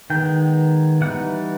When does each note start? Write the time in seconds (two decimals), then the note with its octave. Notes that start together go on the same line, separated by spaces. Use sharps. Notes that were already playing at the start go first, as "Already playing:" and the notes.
0.10 D#3 G#3 B3 G5
1.01 E3 G3 B3 D#4 F#5